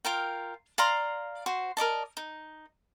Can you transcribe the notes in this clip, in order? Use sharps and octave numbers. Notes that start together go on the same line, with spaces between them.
F4 A#4 G5
D5 F5 A#5 C6
F#4 C5
A#4 D5 D#5 A5
D#4